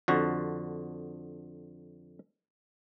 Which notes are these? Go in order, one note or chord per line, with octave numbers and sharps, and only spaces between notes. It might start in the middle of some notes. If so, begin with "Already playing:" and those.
F2 D3 F#4